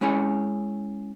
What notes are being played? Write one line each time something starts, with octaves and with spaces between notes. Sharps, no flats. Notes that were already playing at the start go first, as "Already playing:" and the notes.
G#3 C#4 E4 C#5 G#5